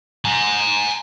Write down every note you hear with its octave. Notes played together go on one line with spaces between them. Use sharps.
G#5 A#5